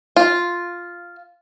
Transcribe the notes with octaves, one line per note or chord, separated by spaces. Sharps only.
F4